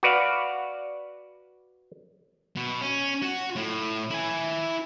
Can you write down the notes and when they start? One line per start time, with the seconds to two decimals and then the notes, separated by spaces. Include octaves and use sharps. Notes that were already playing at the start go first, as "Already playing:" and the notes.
0.03 F#4 B4 D5 F5
2.56 B2
2.81 C#4
3.22 F#4
3.56 A2
4.10 E4 G#5